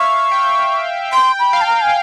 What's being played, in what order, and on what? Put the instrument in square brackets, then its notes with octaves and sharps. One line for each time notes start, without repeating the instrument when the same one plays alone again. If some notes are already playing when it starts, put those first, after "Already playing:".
Already playing: [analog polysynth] E5 F5 [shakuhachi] C#6
[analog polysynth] G5
[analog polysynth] G5 [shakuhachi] C6
[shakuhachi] B5
[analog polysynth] F5
[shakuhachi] A5
A#5
G#5